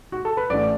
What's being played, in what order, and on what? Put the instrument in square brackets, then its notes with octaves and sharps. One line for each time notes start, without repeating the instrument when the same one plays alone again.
[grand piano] F#4
A4
B4
A1 A2 E3 D4 D5